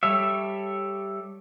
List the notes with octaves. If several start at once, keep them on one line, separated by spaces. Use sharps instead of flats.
G3 A4 C#5 E5